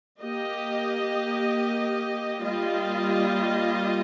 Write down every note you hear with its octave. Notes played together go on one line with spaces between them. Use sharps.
A#3 G4 D#5
G3 A#3 F4 D#5